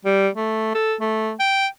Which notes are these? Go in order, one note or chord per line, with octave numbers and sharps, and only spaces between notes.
G3
A3
A4
A3
G5